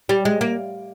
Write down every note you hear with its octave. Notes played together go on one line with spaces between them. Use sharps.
G3
G#3
A#3